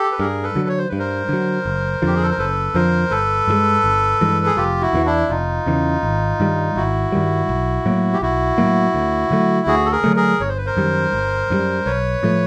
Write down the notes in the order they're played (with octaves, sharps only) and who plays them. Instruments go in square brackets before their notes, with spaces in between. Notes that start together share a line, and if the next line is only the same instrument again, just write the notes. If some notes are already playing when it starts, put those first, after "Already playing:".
Already playing: [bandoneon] G4 A4
B4
[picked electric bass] G2 [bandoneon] G#4 A#4
[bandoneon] A4 B4
[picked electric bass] D3 F#3
[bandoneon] C#5
C5
[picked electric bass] G2 [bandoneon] B4
[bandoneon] A#4 C5
[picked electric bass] D3 F#3
F#1
[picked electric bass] F2 D3 F3 [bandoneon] G4
[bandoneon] G#4
A4
A#4
[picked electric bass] F#1 [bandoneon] A4 B4
[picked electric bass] F2 D3 F3 [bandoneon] A#4 C5
[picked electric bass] G1 [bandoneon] A4 B4
[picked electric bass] G2 E3 G#3
G1
G2 E3 G#3
[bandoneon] G#4
[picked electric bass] F1 [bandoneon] F4 G4
[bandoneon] E4 F#4
[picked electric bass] E2 C#3 E3
[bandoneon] D4 E4
[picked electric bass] F1 [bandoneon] D#4 F4
[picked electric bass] E2 C#3 E3
G#1
G2 D#3 G3
[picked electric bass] G#1 [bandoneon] E4 F#4
[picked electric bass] G2 D#3 G3
B1
A2 F#3 A#3
[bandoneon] G4
[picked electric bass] B1 [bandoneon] E4 F#4
[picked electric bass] A2 F#3 A#3
D2
D3 F#3 A3
[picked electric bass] D2 [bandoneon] F#4 G#4
[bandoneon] A4
G#4 A#4
[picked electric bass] D3 F#3 A3
[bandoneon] G#4 A#4
[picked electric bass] G1 [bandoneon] C#5
[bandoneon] C5
B4
A#4 C5
[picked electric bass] F#2 D#3 G3
G1
F#2 D#3 G3
[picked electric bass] B1 [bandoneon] B4 C#5
[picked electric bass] A2 F3 A3